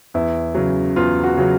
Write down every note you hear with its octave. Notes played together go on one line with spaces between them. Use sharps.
E2 E4
C#3 F#3
E2 F4
F#4
C#3 F#3